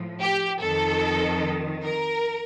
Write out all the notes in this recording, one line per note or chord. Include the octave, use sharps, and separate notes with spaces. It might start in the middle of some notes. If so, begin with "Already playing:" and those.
Already playing: A2 F3
G4
F2 D#3 A4
A#4